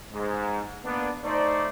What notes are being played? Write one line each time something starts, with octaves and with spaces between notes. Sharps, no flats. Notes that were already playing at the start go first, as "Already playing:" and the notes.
G#2
A#3 B3 D4
A3 D#4 C5 D5